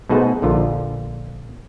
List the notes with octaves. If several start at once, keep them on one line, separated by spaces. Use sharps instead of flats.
B2 A3 D#4 G#4 C5 F#5
A#1 D3 F4